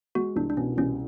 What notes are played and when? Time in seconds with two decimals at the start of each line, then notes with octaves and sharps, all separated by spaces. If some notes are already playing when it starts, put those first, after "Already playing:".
0.15 G#3 F#4
0.36 C2 D4
0.50 D4
0.57 B2 C#4
0.77 C2 C#4